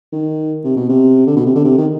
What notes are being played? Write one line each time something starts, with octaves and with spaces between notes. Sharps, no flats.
D#3
C3
B2
C3
D3
B2
C3
D3
C3
D#3